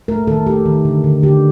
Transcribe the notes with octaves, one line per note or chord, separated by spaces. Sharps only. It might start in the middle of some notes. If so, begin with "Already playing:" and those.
A3 A#4
D#3 A4
A3 G4
D#3
D3
D3
D3 G4